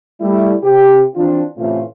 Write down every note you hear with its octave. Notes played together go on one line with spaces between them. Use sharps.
G3 A3 E4
C3 G4
E3 C4 D4 F4
A2 C3 E3 A3 C#4 F4